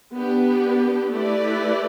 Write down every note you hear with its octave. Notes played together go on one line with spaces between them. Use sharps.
B3 D4 G4
A3 E4 G4 B4 D5